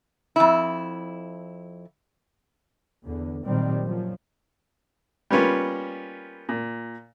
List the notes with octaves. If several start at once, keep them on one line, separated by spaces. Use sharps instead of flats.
F2 E4
E2 D3
A#2 D#3 F#3 G3 C4
F#2 F3
G3 A#3 B3 C#4 F4
A#2